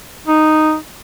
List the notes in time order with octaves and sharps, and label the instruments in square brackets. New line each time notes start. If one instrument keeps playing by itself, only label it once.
[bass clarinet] D#4